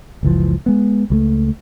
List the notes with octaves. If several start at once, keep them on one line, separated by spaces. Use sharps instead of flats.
F#1 C#2 E3 F3
G#3 B3
C#2 F#3 A3